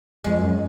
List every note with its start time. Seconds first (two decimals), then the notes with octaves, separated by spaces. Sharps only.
0.24 F2 G#3
0.39 F#2